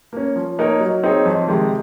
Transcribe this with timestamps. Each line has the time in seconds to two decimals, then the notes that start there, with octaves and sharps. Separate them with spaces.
0.13 A#3 C#4
0.36 F3
0.59 A#3 D#4 A#4 C#5
0.80 F#3
1.03 C4 D#4 G#4 C#5
1.26 F2
1.48 C3 D#3 G#3